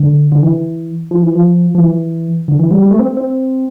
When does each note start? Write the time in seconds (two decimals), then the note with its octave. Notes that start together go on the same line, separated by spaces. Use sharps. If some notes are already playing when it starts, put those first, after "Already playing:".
Already playing: D3
0.32 D3
0.43 E3
1.11 F3
1.23 E3
1.35 F3
1.75 F3
1.80 E3
2.48 D3
2.59 E3
2.71 G3
2.82 G3
2.91 A3
2.99 C4
3.17 C4